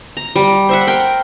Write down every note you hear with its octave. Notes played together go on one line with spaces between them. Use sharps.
A#5
G3
C5 E5 F#5
A#4 G5